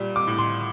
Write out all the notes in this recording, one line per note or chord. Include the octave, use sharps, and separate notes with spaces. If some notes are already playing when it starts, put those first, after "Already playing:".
Already playing: A#2 G3
D6
A2
C6